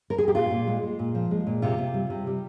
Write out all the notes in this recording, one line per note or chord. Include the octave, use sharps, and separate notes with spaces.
A#4
G#4
G4
A#2 F4
A#2
G#3
G#3
A#2
F3
G#3
A#2
C3 F4
C3
G3
C3
G3